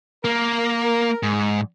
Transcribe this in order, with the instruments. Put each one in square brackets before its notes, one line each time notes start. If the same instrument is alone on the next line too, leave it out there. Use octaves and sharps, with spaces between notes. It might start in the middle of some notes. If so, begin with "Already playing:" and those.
[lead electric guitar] A#3 [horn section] A#4
[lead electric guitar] G#2